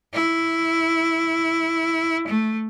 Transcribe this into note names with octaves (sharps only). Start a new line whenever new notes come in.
E4
A3